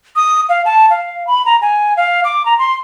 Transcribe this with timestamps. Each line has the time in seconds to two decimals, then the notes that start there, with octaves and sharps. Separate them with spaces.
0.16 D#6
0.49 F5
0.65 A5
0.90 F5
1.27 B5
1.46 A#5
1.62 G#5
1.97 F5
2.24 D6
2.46 A#5
2.59 C6